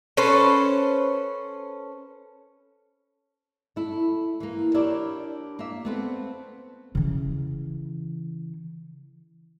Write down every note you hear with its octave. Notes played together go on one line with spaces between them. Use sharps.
C#4 A4 B4 C5
A3 E4
E3 A#3
D4 E4 G4 A#4 C#5 D5
A#3 E5
A3 B3 C4
C#3 E3